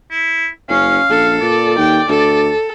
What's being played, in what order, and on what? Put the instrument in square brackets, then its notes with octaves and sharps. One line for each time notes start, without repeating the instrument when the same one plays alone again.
[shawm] E4
[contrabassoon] F#1 [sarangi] C#4 [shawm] F5
[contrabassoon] A#1 [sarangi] A4
[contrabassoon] A#2 [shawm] D5
[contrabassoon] D#2 [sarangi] G5
[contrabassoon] D2 [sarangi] A4